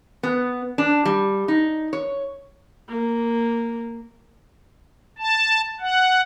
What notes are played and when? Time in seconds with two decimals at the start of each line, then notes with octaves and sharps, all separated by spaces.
0.23 B3
0.78 D4
1.05 G3
1.48 D#4
1.93 C#5
2.89 A#3
5.18 A5
5.80 F#5